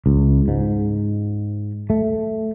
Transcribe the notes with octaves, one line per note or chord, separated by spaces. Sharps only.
C#2
G#2
A3